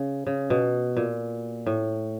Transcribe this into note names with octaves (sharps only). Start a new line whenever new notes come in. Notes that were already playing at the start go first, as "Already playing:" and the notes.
Already playing: C#3
C#3
B2
A#2
A2